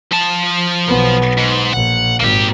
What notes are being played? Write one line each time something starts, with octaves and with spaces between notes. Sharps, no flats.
F3 A5
B1 B3
G#2
A#1 F#5
G#1 A#3 G4